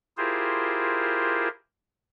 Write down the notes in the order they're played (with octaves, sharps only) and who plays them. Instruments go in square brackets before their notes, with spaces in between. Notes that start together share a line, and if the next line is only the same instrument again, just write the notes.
[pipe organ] E4 F4 G4 G#4 A#4 C5